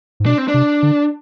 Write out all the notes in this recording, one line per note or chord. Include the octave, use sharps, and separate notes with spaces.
G#2
B2 D4
C4
D4
C3
D3